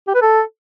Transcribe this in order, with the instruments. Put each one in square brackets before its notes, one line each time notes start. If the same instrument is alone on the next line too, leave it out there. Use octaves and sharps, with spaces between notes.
[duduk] G4
B4
A4